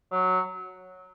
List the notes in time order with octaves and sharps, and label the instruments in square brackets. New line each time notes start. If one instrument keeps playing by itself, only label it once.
[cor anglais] F#3